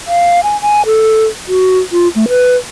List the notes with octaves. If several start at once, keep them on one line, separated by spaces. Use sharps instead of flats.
F5
G#5
G#5
A4
F#4
F4
A3
B4